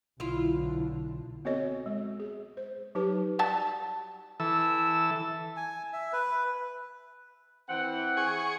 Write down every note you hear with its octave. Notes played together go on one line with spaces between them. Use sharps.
B1 D3 E4 F4
B3 C4 F#4 A4 C#5 D#5
G#3
G#4
C5
F#3 D#4 G4 B4 A5
F#3 G3 A5
E3 A4 E6
G#5
E5
B4
E3 C4 F#5
G#4 C#6